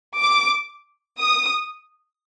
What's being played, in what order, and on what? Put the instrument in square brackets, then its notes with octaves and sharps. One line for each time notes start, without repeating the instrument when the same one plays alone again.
[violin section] D6
D#6